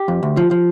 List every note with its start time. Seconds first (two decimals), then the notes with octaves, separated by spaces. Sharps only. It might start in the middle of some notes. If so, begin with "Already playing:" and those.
Already playing: G4
0.08 F2
0.23 D2
0.37 F3
0.51 F3